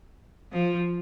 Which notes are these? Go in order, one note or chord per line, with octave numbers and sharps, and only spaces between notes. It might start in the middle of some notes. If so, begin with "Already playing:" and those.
F3